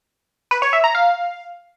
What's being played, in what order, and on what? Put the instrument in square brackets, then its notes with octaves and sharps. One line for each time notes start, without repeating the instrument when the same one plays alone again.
[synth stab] B4
C#5
E5
A#5
F5